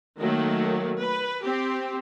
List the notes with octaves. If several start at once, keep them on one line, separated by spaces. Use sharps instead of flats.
D#3 F#3 A3 A#3
B4
C4 G4